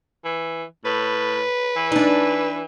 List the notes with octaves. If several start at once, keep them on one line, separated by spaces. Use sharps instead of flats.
E3
A2 B4
E3
D4 D#4